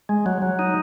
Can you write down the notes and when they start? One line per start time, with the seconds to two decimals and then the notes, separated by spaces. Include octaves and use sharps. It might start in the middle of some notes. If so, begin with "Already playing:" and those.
0.09 G#3
0.26 F#3
0.42 F#3
0.59 D#4